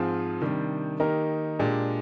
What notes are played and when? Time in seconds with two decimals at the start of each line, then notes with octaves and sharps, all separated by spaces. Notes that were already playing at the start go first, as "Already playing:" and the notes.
Already playing: G#2 F3 C4 F4 G#4
0.40 C3 D#3 G3 D4
1.00 D#3 A#3 D#4 G4 A#4
1.59 A#2 G#3 D4 G4